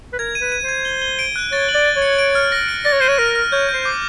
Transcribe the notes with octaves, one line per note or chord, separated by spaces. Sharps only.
B4
A#4 G#6
D#7
B4
D#7
C5
G#6
G7
G7
D7
F#6
C#5 A6
F#7
D5
A6
C#5
C#7
D7
F6
A#6
D7
D5 A#6
C#5
C5 D#7
C#5
A#4 F6
F6
C#5 G6
G6
C5
D6